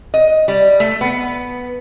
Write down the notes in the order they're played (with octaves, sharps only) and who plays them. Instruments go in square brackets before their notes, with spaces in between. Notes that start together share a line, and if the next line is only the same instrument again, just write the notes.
[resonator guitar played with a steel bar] D#5
G3
A3
B3